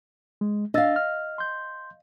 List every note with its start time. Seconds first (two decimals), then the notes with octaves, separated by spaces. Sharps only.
0.41 G#3
0.74 D4 D#5 F5 E6 A6
0.96 F6
1.38 C6 G6